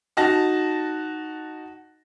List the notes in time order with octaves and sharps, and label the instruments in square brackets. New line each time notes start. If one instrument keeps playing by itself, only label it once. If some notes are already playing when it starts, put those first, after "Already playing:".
[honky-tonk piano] D#4 F#4 A5 A#6